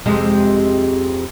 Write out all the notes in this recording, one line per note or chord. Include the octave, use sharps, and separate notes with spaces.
F2 C3 G#3